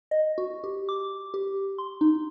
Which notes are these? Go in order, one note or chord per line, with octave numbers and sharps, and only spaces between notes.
D#5
F#4
G4
D6
G4
C6
D#4